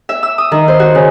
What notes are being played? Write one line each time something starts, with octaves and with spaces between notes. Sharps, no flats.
E5
E6
D#6
D#3
C5
F#4
C#3